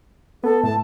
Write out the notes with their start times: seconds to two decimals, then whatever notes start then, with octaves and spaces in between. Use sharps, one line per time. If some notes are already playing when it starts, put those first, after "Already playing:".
0.44 B3 A4
0.63 A2 A5